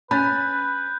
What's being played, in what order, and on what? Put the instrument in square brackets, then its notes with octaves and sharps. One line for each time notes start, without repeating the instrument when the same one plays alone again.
[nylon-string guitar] C#4 [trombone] B4 [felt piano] B5 A6 [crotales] F#6 G6